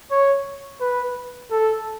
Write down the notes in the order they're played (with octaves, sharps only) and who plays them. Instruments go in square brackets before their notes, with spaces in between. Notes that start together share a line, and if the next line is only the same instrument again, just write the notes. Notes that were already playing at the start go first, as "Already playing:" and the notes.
[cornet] C#5
B4
A4